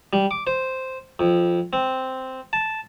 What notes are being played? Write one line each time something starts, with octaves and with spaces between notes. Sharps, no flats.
G3
D6
C5
F2
C4
A5